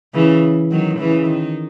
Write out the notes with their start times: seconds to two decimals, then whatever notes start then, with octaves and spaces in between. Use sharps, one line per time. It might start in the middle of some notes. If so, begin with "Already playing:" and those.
0.14 C#3 E3
0.71 D#3 F#3
0.99 C#3 E3
1.27 D#3